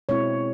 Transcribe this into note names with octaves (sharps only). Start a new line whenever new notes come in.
B2 G#3 C4 E4 C#5